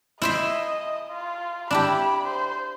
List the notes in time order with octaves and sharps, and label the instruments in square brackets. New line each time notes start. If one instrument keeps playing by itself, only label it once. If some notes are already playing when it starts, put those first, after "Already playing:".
[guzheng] E4 C5 E5 [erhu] D#5
[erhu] F4
[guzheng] D4 E4 G4 [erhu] B5
[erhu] C5